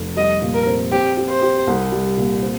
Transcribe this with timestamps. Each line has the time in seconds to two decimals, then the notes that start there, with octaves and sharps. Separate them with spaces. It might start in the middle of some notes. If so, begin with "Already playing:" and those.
Already playing: F1
0.16 G3 D#5
0.42 A#2
0.54 A#4
0.67 C4
0.92 C4 G4
1.17 G4
1.29 C5
1.42 G4
1.67 C2
1.92 G3
2.17 A#2
2.42 C4